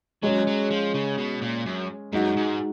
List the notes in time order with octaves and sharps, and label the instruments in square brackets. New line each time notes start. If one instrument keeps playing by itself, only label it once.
[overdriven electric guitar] F#3 [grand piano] G#3 C#4 G#4
[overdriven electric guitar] F#3
F3
C#3
B2
A#2
F#2
[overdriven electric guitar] F#2 [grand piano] G#3 D#4 F#4
[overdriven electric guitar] G#2